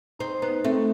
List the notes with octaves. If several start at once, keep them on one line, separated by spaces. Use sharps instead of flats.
C4 D#4
B3 D#4
A3 C4